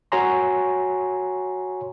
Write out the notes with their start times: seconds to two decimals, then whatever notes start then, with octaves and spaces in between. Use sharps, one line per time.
0.12 F#4 C#5 G#5 A#5 C6